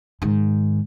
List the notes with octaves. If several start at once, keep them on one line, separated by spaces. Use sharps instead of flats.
G#2 D#3